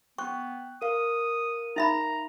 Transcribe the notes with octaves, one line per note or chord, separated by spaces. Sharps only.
B3 G5 C#6 F#6
A#4 F5 D#6
D#4 E5 A#5 B5